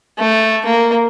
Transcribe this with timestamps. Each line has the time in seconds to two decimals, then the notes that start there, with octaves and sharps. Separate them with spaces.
0.19 A3
0.65 A#3